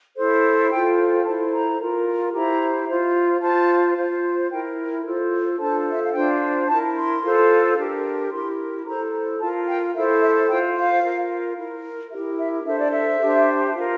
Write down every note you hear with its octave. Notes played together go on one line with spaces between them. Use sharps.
E4 A4 C5
F4 A4 C5 G5
E4 A4 C5 A5
A#5
F4 A#4
E4 G4 C5 A#5
F4 C5
F4 C5 A5
F4 C5
E4 A#4 G5
F4 A4 C5
D4 F4 A4 C5 A5
E5
F5
D4 F4 C5 G5
E4 A#4 A5
C6
F4 A4 C5
D4 G4 A#4
E4 G4 A#4 C6
E4 A4 C5 A#5
F4 A#4 A5
G5
E4 A4 C5 E5
E5
F4 C5 G5
F5
F4 A#4
E4 A#4
E4 G4 A#4 E5
E5
D4 A4 C5 E5
D5
E5
D4 G4 C5
F4 A#4